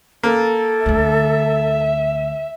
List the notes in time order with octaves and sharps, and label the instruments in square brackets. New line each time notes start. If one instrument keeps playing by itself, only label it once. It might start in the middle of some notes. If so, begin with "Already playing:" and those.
[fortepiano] A#3 [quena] A4
[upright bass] D2 D3 [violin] E5